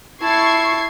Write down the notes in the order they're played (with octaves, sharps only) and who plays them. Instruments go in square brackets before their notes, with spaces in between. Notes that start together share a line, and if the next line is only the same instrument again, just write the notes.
[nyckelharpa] E4 A5 [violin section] C#6 G#6 C7